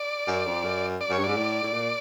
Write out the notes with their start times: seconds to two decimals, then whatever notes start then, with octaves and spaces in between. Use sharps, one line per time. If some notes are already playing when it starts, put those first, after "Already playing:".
Already playing: D5
0.27 F#2
0.46 F2
0.64 F#2
1.01 D5
1.09 F#2 C#5
1.18 G2
1.24 G#2 D5
1.36 A2
1.63 A2
1.73 A#2